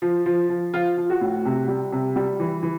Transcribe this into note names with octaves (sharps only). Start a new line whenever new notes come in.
F3
F3
F3
F3 F4
F3
F#4
A2
C3
G3
C3
G3
E3
E3